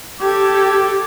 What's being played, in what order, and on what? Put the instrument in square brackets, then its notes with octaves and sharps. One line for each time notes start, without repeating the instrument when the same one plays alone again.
[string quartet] G4 A4 G#6 [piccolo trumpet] D6